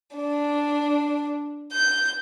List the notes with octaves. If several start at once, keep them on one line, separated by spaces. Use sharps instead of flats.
D4
G6